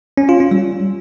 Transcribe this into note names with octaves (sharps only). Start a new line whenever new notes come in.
C#4
F4
C#4
G3